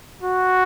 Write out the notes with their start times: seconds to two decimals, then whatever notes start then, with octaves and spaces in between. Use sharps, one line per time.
0.23 F#4